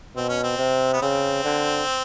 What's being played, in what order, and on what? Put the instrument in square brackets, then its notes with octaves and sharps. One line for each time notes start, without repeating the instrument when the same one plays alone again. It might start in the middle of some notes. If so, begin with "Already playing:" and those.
[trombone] B2 [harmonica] C4
[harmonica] C#4
C4
[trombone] C3
[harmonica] B3
[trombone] C#3 [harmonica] C4
[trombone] D3